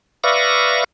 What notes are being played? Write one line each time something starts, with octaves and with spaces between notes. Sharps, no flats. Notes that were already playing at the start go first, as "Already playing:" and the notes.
B4 D5 E5 F5 C#6 A#6